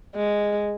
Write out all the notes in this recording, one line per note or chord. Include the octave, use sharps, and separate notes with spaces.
G#3